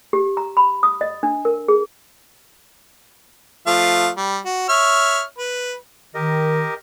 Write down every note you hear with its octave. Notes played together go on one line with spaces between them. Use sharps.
G4
A#5
B5
D#6
D#5
D4
A#4
G#4
F3 A3 F5
G3
F#4
C#5 E5 F6
B4
D#3 G4 A#4 D#5